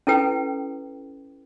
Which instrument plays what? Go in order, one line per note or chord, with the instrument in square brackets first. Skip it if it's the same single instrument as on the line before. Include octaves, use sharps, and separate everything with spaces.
[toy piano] C#4 E4 A4 B4 G5